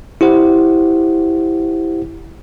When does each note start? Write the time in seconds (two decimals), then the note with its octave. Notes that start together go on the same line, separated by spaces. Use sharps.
0.21 E4 G4 C5 F#5